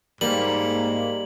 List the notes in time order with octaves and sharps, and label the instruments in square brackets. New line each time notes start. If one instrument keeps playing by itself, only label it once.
[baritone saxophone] G#2 [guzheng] G3 [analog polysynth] A#3 [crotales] F#7